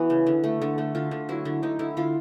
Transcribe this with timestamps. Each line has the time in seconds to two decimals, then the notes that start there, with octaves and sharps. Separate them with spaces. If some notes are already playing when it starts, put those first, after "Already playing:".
Already playing: E3 B3 F#4
0.10 C#3
0.27 D3
0.44 A3
0.61 D3
0.78 A3
0.95 D3 F4
1.11 D3
1.29 F#3 E4
1.45 D3
1.63 D3 D#4
1.79 D3 E4
1.97 D3 F4